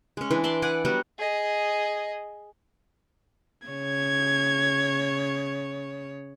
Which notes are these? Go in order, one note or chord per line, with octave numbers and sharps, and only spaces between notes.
G#3 C#4
E3 D4
D5 E5 A5 C6
B4 D5 F#5 G#5
F#3 G3 B3 F#4
G#4 D#5
C#3 C#5 G#6